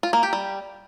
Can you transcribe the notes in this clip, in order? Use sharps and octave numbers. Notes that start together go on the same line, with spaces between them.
F4
A#3
G4
G3